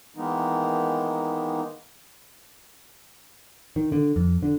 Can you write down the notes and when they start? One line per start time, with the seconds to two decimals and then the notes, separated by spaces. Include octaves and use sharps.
0.16 D#3 E3 G#3 A#3 B3 D#4
3.76 D#3
3.92 D3
4.16 F2
4.42 D3